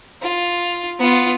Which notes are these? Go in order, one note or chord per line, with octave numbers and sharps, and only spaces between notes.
F4
B3 F4